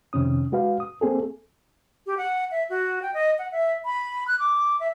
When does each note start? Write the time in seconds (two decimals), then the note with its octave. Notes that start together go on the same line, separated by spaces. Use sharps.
0.13 F2 C3 D#3 C#4 D#6
0.52 G#3 F#4 B4 F5
0.80 D#6
1.01 A#3 C4 G#4 A4
2.06 G4
2.18 F#5
2.51 E5
2.70 F#4
3.02 G5
3.14 D#5
3.39 F#5
3.52 E5
3.85 B5
4.28 F#6
4.39 D6
4.80 E5